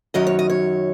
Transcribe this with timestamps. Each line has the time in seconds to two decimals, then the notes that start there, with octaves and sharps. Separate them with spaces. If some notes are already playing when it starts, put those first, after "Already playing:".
0.14 F#2 D#3 F#3 D#5
0.27 C#5
0.39 D#5
0.50 C#5